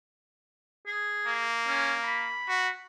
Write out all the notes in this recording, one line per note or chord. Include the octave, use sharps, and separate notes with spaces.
G#4
A#3
C#4
B5
F#4